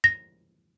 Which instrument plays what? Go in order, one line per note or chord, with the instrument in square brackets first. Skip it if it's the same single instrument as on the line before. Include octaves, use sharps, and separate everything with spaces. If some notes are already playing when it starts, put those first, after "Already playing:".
[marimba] A#6